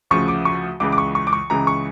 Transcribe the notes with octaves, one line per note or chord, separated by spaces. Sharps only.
D2 C#3 F3 C#6
D6
C#6
C#2 C#3 E3 D6
D6
C#6
C#6
D6
C#6
C#2 C#3 E3 A#5
C#6